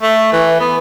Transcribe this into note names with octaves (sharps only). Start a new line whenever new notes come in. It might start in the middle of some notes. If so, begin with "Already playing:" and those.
A3
E3
B3